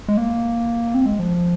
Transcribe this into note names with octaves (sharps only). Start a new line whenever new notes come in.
G#3
A#3
C4
G#3
F3